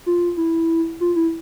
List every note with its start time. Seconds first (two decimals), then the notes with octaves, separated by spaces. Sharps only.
0.06 F4
0.37 E4
1.00 F4
1.16 E4